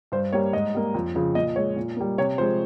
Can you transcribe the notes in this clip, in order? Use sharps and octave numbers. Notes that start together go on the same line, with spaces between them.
G2 C5
G3 A#3 C#5
G#2 D#5
G3 A#3
F2
C#3 F3
A#2 D#5
G#3 C#5
A#2
G3 A#3
C3 C#5
F3 G#3 C5